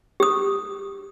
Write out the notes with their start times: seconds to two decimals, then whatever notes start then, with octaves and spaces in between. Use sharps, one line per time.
0.20 G4 D#6